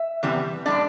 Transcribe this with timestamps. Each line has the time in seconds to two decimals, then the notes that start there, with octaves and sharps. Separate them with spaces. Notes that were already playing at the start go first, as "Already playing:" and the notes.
Already playing: E5
0.23 E2 C3 E3 G3 B3
0.66 A2 G3 B3 D4 D5